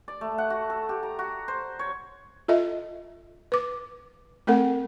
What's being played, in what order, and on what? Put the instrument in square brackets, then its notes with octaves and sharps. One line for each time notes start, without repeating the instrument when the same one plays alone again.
[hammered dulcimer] D5
A3
F#5
F#4
A4
G4
A#5
F#4
C5
C#5
[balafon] F4 A4 D#5 E5
B4 D6
A3 C4 A4 A#4 F#5